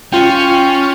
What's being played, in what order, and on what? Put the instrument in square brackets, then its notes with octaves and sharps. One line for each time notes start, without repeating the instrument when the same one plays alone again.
[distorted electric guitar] C#4 [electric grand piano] F4 G5